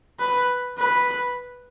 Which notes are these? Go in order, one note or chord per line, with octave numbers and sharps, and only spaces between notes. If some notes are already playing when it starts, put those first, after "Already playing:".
B4
B4